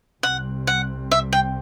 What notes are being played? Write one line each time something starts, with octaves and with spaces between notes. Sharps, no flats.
C2 C3 G3 C4 F#5
F#5
E5
G5